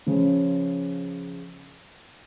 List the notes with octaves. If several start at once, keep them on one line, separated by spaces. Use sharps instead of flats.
C#3 F3 C#4